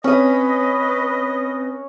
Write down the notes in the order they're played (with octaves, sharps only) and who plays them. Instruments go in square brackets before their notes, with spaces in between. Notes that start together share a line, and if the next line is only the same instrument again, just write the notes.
[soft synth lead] C4 [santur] C#4 D#6 [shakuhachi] B4 [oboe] D#5